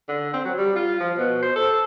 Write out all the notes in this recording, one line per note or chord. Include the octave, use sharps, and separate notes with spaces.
D3
C4
F#3
G3
F4
F3
B2
C5
A4